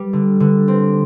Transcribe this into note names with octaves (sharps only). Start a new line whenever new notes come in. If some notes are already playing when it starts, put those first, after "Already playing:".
Already playing: G3
D3
D3
C4